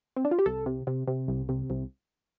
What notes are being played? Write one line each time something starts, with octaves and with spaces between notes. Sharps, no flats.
C4
D4
F4
G4
C2 A4
C3
C3
C3
C2
C3
C2